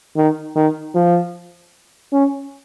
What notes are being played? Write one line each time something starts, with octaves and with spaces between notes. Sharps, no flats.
D#3
D#3
F3
C#4